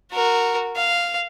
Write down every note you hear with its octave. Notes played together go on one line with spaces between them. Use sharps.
F#4 A#4
F5